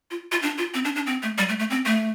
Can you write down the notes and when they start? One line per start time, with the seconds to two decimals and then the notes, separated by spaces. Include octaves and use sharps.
0.11 F4
0.32 F4
0.42 D4
0.58 F4
0.74 C4
0.85 D4
0.96 D4
1.06 C4
1.23 A3
1.38 G3
1.49 A3
1.59 A3
1.70 C4
1.86 A3